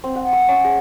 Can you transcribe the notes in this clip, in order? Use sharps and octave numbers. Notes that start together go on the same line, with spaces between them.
C4
F#5
E6
C#4
G#4